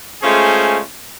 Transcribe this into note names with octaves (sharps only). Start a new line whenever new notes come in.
G#3 A3 C#4 F4 G#4 C5